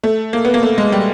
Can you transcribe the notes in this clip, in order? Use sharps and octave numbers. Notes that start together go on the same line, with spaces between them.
A3
A#3
B3
A#3
A3
G#3
G3